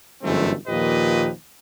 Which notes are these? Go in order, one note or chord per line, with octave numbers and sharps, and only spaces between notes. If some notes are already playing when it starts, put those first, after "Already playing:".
G1 F#2 E3 G#3 A3 C4
D#2 A#2 F3 G4 B4 D#5